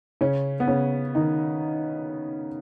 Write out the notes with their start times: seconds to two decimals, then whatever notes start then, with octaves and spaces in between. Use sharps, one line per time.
0.21 C#3 C#4
0.60 B3
0.67 C#3 C#4
1.15 D#3 D#4